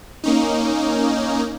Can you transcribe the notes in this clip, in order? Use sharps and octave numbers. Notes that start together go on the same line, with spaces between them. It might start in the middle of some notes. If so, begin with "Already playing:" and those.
A#3 C#4 D#4